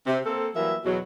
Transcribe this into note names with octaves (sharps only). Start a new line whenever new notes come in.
C3
A#3 C4 A4
E3 F#3 G3 A#3 E5
E2 B2 F#3